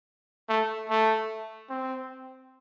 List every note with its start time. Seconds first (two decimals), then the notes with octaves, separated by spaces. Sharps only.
0.49 A3
0.89 A3
1.69 C4